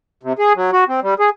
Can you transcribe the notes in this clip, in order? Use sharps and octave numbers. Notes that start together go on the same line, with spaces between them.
C3
G#4
F#3
F#4
C4
G3
G#4